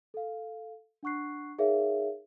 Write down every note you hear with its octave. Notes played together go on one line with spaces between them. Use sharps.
A4 F5
D4 F#5 C#6 F#6 C7
D#4 G#4 A#4 C#5 E5 F5